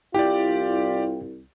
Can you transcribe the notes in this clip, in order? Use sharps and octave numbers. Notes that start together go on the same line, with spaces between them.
C2 E4 F4 G4 D5 G5